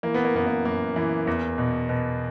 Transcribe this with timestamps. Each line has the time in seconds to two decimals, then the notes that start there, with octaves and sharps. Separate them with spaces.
0.03 E3 A#3
0.14 B3
0.25 A#3
0.34 F#2 B3
0.46 A#3
0.65 F#2 A#3
0.96 E3
1.27 E2
1.58 B2
1.89 B2